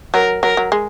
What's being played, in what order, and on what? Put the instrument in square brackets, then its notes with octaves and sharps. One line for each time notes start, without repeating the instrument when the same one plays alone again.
[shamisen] F#3 [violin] A#4
[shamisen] F#3 [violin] A#4
[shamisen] F#3
G#3